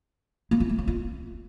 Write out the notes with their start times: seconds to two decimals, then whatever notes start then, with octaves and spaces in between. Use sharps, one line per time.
0.51 A#3
0.60 F4
0.69 A3
0.78 F#3
0.88 F4